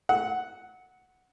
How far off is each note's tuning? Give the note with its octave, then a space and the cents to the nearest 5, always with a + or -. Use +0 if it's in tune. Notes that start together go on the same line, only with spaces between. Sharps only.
F#5 +0 E6 -40